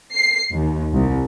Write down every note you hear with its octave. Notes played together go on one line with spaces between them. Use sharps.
C7
D#2
C2